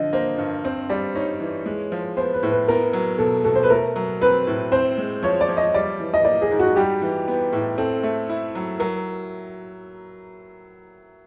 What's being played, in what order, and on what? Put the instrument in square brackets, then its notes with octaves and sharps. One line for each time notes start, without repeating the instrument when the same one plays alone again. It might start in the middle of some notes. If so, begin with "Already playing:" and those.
Already playing: [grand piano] D3 F3 [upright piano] D#5
[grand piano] A#3 [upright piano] C5
[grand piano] G2
[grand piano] C4 [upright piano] C5
[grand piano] G3 [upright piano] D5
[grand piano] D#4 [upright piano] C#5
[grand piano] E3
G#3
F3
[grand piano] B3 [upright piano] C5
[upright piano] B4
[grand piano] A2
[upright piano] B4
[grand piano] B3 [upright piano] A#4
[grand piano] F#3
[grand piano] B2 [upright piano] A4
[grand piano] B2 [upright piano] A4
[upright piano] C5
B4
[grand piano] A3 [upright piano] A#4
[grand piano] F#3
[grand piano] C4 [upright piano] B4
[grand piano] A2
[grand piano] C4 [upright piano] C5
[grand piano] G#3
[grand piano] F3 [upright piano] C#5
[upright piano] D5
[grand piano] F3
[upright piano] D#5
[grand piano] G3 [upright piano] D5
[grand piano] E3
[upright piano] D#5
[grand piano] A#3 [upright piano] D5
[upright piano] G#4
[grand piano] G#2
[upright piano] F#4
[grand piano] G3 [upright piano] G4
[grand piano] E3
B3
A2
[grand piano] C4 [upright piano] A4
[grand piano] A3
E4
F#3
[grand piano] F#3 [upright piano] A#4